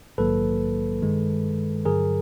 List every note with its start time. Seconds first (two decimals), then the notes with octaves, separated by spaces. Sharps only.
0.18 A#1 G#2 D#3 F#3 A#3 A4 B4
1.01 G2 D#3 G#3
1.85 G2 D3 F#3 G#4 A#4